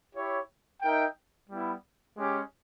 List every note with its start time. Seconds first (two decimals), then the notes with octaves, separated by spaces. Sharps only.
0.15 E4 G4 C#5
0.82 D#4 A#4 E5 G5
1.49 G3 B3 E4
2.16 G#3 C#4 G4